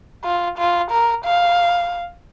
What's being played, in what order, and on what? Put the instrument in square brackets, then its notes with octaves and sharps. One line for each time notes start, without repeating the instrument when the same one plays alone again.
[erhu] F4
F4
A#4
F5